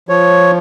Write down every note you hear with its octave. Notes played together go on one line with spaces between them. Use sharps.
F3 C#5